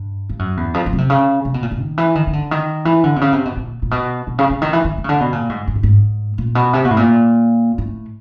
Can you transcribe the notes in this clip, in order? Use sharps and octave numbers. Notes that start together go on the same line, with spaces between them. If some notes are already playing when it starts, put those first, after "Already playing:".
Already playing: G2
G2
F#2
E2
F2
F#2
C#3
C3
C#3
C3
B2
A#2
A2
D#3
E3
D#3
D#3
D3
D#3
E3
D3
C3
C#3
C3
B2
A#2
A#2
B2
B2
C#3
C#3
D#3
E3
D#3
D#3
C#3
D3
B2
A#2
G#2
G#2
A2
G#2
A#2
B2
C3
B2
A2
A#2
A2